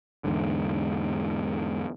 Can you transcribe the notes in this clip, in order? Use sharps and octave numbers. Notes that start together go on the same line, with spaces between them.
E2 G#2 D3